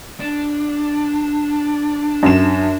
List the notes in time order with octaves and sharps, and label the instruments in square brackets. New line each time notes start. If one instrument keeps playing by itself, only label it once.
[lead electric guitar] D4
[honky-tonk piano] F#2 E7